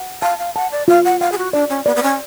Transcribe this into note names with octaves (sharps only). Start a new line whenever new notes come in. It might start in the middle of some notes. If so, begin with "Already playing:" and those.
Already playing: F#5
F5 A5
F5
F#5 A5
D5
F4 F5
F#5
F5 F#5
G#4
F#4
D4 D5
C#4
B3 D5
B3
C#4